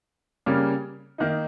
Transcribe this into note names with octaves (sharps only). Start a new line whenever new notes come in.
C#3 G3 A#3 C#4
D#3 A#3 D#4